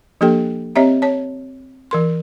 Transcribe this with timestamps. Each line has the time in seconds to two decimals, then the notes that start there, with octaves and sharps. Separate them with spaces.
0.21 F3 A#3 D4 G4 A4 G5
0.75 C4 G4 C#5 D#5 E5 A#5
1.02 C#5 A5
1.91 E3 A#4 C6